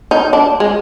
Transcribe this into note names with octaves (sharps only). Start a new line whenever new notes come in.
D#4
D4
G#3